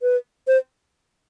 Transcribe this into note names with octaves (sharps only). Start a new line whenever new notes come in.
B4
C5